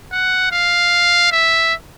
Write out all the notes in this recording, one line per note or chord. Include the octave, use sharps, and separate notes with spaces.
F#5
F5
E5